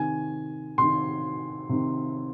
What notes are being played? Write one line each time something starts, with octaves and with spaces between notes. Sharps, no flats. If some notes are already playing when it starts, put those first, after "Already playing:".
Already playing: C3 D#3 G#5
C3 D#3 C6
C3 D#3